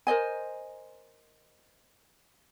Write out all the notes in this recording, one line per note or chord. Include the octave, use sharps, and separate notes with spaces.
A#4 C5 D#5 G#5